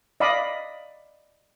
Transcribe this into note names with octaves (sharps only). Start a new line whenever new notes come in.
D5 D#5 F5 B5 D#6